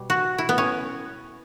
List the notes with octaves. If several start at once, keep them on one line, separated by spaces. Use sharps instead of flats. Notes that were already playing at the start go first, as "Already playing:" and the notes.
Already playing: B2 G3
F#4
E4
B3
C#4